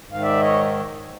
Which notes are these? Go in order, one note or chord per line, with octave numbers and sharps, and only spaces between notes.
G#2
D#3 F5
D5 E5
C#5 D#5